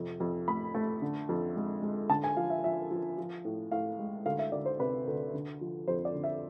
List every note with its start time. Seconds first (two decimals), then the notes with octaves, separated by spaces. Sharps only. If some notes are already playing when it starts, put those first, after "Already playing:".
Already playing: F2 C3
0.20 F2
0.48 A3 B5
0.75 A3
1.02 D3
1.29 F2
1.56 G#3
1.82 G#3
2.09 D3 A5
2.24 G#5
2.37 F3 F5
2.50 E5
2.64 F3 E5
2.91 F3
3.18 F3
3.45 A2
3.72 A2 F5
3.99 G#3
4.26 D2 F5
4.39 E5
4.52 D2 D5
4.66 C5
4.79 C3 B4
5.07 D2
5.33 D3
5.61 F3
5.88 F2 C5
6.05 D5
6.15 D3
6.24 E5